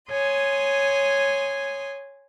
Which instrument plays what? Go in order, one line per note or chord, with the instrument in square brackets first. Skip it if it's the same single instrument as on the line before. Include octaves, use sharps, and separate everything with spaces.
[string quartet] C#5 G#5 C6 D#6